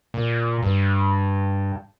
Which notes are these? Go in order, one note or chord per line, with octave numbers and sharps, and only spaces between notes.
A#2
G2